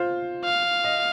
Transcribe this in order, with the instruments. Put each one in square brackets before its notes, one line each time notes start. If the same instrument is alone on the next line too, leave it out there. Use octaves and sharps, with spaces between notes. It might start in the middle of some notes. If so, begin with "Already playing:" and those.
Already playing: [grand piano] F4 C5
[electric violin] F5
[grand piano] D#5